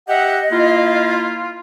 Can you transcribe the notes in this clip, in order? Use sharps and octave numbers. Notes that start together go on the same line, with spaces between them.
G4 D#5 E5 F#5
A#3 E4 F4